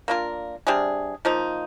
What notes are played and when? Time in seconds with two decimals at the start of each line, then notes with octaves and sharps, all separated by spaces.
0.08 A#3 D4 F4 A#4
0.67 C3 G3 D4 G#4
1.25 F3 A#3 D#4